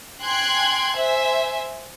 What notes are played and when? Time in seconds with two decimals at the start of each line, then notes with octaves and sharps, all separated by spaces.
0.22 G5 G#5 C6 F#6 G#6
0.96 C5 E5 G#5